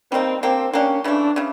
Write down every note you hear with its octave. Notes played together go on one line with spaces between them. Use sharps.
G3 A#3 C4 D#4
A#3 C4 D4 G4
A#3 C#4 D4 G4
C#3 E3 A3 D4
C#3 E3